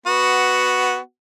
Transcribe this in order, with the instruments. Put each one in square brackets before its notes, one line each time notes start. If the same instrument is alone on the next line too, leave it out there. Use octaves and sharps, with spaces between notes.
[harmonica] B3 F#4